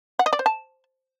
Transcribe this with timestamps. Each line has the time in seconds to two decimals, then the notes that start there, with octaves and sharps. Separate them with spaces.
0.19 F#5
0.26 D#5
0.33 D5
0.39 C5
0.46 A5